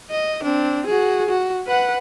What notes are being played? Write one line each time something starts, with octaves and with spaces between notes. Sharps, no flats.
D#5
C4 D4
F#4 G#4
F#4
B4 F#5